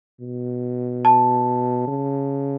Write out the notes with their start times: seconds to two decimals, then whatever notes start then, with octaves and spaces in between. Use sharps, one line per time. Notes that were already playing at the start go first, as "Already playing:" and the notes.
0.20 B2
1.05 A5
1.88 C#3